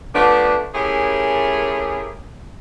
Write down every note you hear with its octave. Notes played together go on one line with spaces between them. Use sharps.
F3 A3 B3 D4
A3 C#4 E4 G4 G#4 A#4